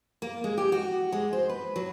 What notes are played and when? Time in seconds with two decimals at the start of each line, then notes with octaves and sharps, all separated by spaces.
0.22 A#3
0.44 G#3
0.57 G4
0.72 F#4
1.12 G#3
1.33 C5
1.49 B4
1.76 F#3